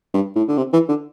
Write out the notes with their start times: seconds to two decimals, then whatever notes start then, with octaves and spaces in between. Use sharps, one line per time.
0.14 G2
0.36 A2
0.48 D3
0.57 C3
0.73 E3
0.89 D3